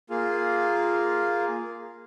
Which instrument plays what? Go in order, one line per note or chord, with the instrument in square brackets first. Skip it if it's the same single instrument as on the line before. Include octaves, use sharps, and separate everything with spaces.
[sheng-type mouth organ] A#3 F4 G#4